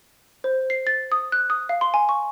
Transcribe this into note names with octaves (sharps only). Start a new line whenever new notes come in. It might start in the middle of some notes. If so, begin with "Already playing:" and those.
C5
C7
A6
D#6
F#6
D#6
F5
C6
G#5
C#6